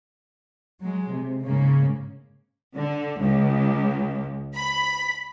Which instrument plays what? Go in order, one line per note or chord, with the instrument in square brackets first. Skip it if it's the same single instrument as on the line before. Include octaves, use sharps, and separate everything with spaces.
[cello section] F#3 G#3
C3
G#2 C#3 A#3 C#4
[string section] D3
C#2
B5